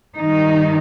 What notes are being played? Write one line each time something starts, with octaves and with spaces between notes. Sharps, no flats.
G2 D#3 D#4